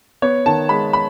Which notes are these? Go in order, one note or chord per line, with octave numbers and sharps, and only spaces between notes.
B3 C#5
D#3 A5
G#3 B5
B5